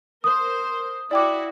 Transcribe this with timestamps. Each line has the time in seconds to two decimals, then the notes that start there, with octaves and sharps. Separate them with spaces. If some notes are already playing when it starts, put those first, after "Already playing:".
0.24 A#4 C5 D#6
1.11 E4 F#4 D5 G5 D6